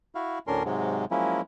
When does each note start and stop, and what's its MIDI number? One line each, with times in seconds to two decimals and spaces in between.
0.15 0.39 64
0.15 0.39 66
0.15 0.39 77
0.47 0.63 38
0.47 0.63 45
0.47 0.63 61
0.47 0.63 62
0.47 0.63 70
0.47 0.63 84
0.65 1.05 44
0.65 1.05 48
0.65 1.05 54
0.65 1.05 56
1.11 1.41 53
1.11 1.41 54
1.11 1.41 56
1.11 1.41 58
1.11 1.41 61
1.11 1.41 64